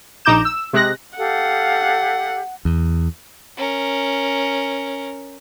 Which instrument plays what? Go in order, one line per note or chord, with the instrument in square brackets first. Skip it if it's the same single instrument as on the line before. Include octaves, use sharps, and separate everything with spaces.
[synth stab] A#1 D#4 A#5 D6 G6 E7
E6
C3 G#3 F#6 A#6
[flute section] G4 A4 F5 [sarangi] F#5
[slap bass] E2
[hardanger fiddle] C#4 A#4